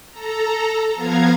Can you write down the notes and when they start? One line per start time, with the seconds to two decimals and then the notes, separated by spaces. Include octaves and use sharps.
0.11 A4 A#5
0.95 F3 B3 F5 A#5 G#6